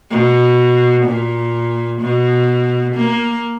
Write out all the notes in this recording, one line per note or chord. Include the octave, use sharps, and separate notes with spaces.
B2
A#2
B2
A#3